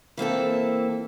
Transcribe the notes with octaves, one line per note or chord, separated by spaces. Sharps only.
E3 A#3 C4 A4